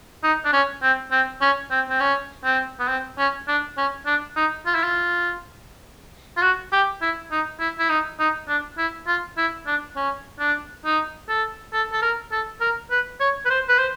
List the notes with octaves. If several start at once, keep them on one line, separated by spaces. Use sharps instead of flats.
D#4
D4
C#4
C4
C4
C#4
C4
C4
C#4
C4
B3
C4
C#4
D4
C#4
D4
D#4
F4
E4
F4
F4
F#4
G4
E4
D#4
E4
E4
D#4
D#4
D4
E4
F4
E4
D4
C#4
D4
D#4
A4
A4
A4
A#4
A4
A#4
B4
C#5
B4
C5
B4
C5